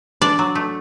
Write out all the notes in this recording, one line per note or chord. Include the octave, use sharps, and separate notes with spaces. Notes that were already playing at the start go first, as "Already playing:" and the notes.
D4 D5
F#3
A3